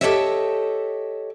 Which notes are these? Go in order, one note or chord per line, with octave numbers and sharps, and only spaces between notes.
G4 A4 B4 C#5 D#5 E5